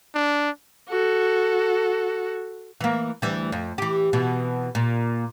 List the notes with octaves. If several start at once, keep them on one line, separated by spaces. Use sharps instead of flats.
D4
F#4 A4
E3 A#3
D2 E3 G3
F2
E3 G4
B2 E3
A#2